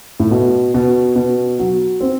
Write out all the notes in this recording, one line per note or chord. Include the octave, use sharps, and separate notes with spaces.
A2
B2
B2
B2
F#3
C4